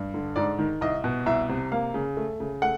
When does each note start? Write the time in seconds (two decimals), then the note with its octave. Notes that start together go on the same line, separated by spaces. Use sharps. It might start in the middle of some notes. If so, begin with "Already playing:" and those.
Already playing: G2
0.14 D3
0.36 G#2 D5
0.59 D#3
0.81 C2 D#5
1.04 B2
1.26 C2 E5
1.49 C3
1.72 A#3 F5
1.94 C#3
2.17 A3
2.40 C#3
2.62 A3 F#5